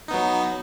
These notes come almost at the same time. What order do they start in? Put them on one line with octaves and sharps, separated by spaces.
D#4 B3 F#3